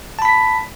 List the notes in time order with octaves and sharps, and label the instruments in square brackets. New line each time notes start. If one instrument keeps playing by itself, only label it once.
[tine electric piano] A5
B5
B6